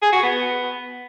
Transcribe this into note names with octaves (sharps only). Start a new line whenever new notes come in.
G#4
F#4
B3